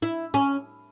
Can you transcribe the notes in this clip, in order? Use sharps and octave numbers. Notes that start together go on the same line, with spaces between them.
E4
C#4